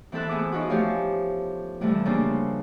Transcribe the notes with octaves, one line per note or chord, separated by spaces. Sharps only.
E3 C4 E4 A4 E5 F#6
A2 B3 G#4 D6
C#4 D#4 F4 F#4
F3 A3 G4 C#5 F5
C3 E3 F3 G3 A3
C#3 A#3 C4 D4